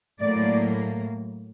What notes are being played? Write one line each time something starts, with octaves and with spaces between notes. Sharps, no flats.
A2 F#3 A#3 D5